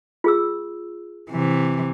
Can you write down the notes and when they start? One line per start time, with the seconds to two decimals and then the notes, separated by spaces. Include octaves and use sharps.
0.24 F4 G#4 E6
1.31 C3 E3